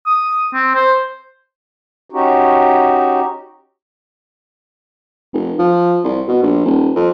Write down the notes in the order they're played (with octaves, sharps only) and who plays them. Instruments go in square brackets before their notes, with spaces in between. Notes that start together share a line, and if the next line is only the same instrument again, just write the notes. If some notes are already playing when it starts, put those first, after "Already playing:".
[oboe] D#6
C4
C5
[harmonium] C#4 D#4 F#4 G4
[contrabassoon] F1
F3
C2
B2
A#1
D#1
F2